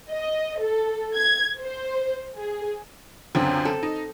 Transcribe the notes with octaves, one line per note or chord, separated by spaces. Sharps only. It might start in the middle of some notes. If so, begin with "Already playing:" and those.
D#5
A4
G#6
C5
G#4
C#2 F#2 D3 C4
A4
D#4